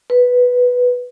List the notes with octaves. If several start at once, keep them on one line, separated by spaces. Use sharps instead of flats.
B4